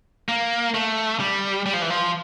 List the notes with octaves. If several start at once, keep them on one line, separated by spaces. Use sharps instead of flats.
A#3
A3
G3
G3
F3
E3
F3